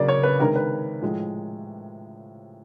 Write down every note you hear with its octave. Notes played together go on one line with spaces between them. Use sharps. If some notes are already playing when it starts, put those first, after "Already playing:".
Already playing: C#3 F#3 A#3 C#4 D5
C#5
B4
C3 D#3 G#3 A#4
B4
A2 F3 G#3